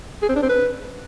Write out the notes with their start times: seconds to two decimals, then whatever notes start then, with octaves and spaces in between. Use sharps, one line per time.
0.22 G#4
0.29 C4
0.36 D4
0.43 C4
0.49 B4